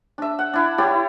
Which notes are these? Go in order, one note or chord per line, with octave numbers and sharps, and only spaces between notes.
D4 E5
F#5
D4 E4
E4 G4 C#5 D5